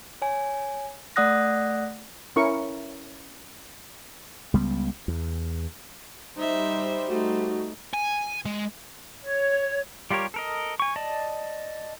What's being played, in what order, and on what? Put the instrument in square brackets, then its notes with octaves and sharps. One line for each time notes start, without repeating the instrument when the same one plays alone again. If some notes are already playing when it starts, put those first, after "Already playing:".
[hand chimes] C#5 G#5
A3 D5 F#5 D#6 F#6 A#6
[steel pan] C#4 E4 A#4 C#6
[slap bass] C#2 G3 B3
E2
[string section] G3 C5 [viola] D#4 E5
[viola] A3 D#4 [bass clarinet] F#4
[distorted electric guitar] G#5
G#3
[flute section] C#5
[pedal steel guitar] G3 F4 G4 A#4 C#5
A4 A#4 D#5
G#5 C#6
D5 D#5 A5